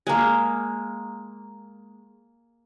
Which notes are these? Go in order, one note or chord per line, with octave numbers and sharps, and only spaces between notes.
G#3 A#3